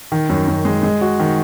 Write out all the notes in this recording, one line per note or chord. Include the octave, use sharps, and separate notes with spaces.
D#3
F#2
F#2
G#3
G#3
F#4
D#3